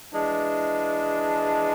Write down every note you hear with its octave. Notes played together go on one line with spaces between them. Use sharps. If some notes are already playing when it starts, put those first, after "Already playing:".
E3 G#3 D4